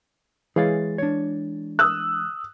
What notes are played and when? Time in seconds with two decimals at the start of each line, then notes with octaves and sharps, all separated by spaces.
0.56 E3 G#3 G#4 C#5 F5 A6
0.98 D4 C#5
1.79 D#6 E6 F#6